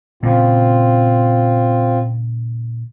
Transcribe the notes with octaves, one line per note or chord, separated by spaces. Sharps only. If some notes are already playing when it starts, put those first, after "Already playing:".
A#2 C#3 C4 F4